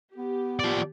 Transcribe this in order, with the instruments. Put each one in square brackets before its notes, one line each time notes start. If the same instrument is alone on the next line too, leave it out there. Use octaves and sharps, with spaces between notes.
[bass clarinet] B3 [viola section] G4
[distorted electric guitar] F3 D5